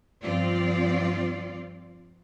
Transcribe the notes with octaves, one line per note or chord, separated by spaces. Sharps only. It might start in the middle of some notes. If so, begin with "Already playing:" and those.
G2 F3 C4 F4 D5